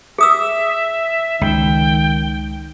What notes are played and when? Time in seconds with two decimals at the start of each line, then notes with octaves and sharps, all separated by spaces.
0.18 G#4 E5 D#6 E6
1.41 C#2 D#3 G5